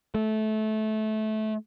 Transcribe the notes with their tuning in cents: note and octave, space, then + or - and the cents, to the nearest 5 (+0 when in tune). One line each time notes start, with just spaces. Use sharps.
A3 -20